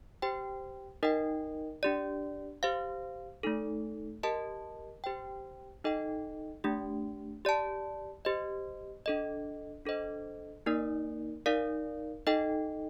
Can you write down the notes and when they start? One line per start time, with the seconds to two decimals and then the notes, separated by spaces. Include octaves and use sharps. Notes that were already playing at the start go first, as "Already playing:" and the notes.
0.22 G4 C5 G5
1.03 D#4 A#4 D#5 G5
1.83 D4 G4 D5
2.63 G4 C5 F5
3.43 A3 D#4 A4
4.23 G4 A#4 D#5 A5
5.04 G4 C5 G5
5.84 D#4 A4 D#5 G5
6.64 A3 D4 G4
7.45 G4 D5 A5
8.25 G4 C5 D#5
9.06 D4 A4 D#5
9.85 D4 A4 C5 D#5
10.66 A#3 D#4 A#4 D5
11.46 D#4 A#4 D5 F5
12.27 D#4 A4 D#5 G5